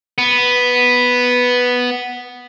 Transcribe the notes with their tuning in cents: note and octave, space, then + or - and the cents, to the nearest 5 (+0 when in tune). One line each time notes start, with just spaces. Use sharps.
B3 +0